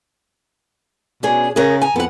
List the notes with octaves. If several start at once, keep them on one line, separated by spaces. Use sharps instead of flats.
B2 C#4 D4 G#4
C#3 G#4 A#4 C#5
G#5 A#5
F2 B3 F#5